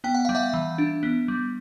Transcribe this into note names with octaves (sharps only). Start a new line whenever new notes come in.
B3 G5
F#5
G3 F5
E5 F#5
E3
D4
B3
G3